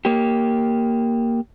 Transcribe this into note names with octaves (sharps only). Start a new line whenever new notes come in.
A#3 G4